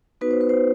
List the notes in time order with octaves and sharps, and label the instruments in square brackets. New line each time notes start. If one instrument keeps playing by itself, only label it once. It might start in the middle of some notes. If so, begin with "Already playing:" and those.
[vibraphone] B3 D#4 F#4 B4
C5
B4
C5